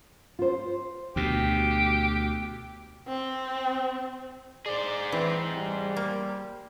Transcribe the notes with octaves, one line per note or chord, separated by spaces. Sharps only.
F4 C5
D2 B2 G4
C4
G#4 C5 D5
E3 C4
G3
A#3